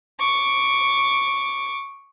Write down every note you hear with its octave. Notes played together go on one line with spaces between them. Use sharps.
C#6 D6